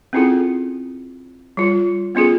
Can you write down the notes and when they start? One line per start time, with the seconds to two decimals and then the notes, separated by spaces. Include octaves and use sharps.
0.13 C4 C#4 E4 F4 G#4 A4
1.57 G3 F4
2.15 B3 C#4 F4 G#4 A4